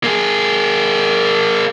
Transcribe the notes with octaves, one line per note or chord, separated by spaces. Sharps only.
A#3 G#4